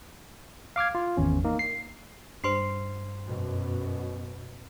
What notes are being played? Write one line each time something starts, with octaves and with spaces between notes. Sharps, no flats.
F5 D6 F6 G#6
F4
G#1 E2 C#4
A#3 D#4
C7
G2 C5 C6 C7
F#2 B2